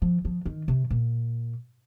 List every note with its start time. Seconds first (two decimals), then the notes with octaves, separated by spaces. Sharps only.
0.02 F3
0.25 F3
0.45 D#3
0.68 C3
0.90 A#2